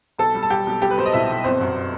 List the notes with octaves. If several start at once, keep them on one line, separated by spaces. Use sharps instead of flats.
B1 A4 A5
G3
A5
G3 G4 G5
B1
G3 G4 G5
B4
B1 C5
D#5
B2 E4 E5
B1
G1 C4 C5
F#2